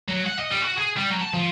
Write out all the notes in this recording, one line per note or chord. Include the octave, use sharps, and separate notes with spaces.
F#3
F#5
D#5
G3
F#4
G#4
G3
F#3
A5
F3